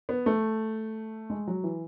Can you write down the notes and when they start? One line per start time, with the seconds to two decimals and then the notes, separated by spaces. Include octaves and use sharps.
0.09 B3
0.26 A3
1.30 G#3
1.47 F#3
1.64 E3